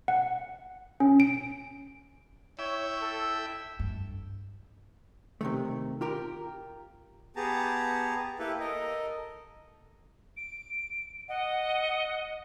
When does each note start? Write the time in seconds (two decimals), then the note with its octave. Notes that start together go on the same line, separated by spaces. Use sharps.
0.08 F#5
1.00 C#4
1.20 D7
2.59 E4 C#5 E5 G5
3.02 A4
3.79 G2
5.41 C3 D#3 A3
6.01 F4 G4 A#4
7.36 B3 G4 G#4 A5 A#5
8.39 A#3 E4 G4 A4 B4
8.60 A4 A#4 D#5
10.37 D7
11.28 D#5 F#5